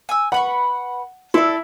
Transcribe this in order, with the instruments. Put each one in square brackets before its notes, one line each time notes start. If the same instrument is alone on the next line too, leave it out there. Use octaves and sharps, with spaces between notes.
[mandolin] G#5 E6
[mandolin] B4 B5 C#6 [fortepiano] F#5
[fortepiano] E4 [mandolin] A4 D5